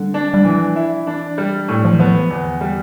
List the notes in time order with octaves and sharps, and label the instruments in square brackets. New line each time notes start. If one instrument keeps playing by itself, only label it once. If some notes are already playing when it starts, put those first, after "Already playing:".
Already playing: [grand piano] D3 [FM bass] G3
[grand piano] D4
[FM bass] G3
[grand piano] E3 [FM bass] F3
[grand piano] E4
[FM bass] E3 [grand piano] D4
[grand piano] G3
[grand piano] A2 [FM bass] F3
[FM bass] F3
E3
[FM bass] F3 [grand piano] B3
[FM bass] E3
[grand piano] E2 [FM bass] D3
[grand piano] G3